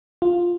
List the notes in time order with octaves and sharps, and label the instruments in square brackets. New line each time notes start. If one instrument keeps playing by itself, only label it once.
[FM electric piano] F4